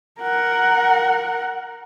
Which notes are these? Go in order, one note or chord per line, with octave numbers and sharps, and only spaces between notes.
A#4 F#5